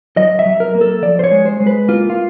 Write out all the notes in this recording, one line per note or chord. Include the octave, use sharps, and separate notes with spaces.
F#3 D#5
E5
F#3
A#4
A#3
A4
F3 D5
C5
C#5
G#3
C5
G#3
B4
A#3 F4
F4